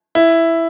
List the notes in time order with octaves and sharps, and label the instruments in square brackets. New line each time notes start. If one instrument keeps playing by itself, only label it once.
[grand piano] E4